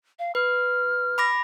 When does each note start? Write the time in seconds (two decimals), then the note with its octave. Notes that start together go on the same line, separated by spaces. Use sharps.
0.19 F5
0.35 B4 F6
1.18 B5 D6 A#6